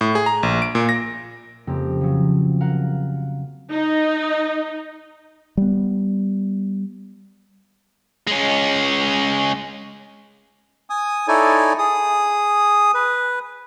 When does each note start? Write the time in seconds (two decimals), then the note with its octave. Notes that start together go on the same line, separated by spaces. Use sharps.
0.01 A2
0.15 G#4
0.26 A#5
0.43 A#1
0.62 D7
0.75 A#2
0.89 A#6
1.67 F2 C#3 A#3 C4 G4 A#4
2.01 F3 F#3
2.61 A#4 F5 F#5
3.71 D#4
5.57 G3 B3
8.27 G#3 C#4
10.90 G#5 D#6
11.28 D#4 E4 A4 C#5 D5 G#5
11.78 G#4 D#6
12.94 B4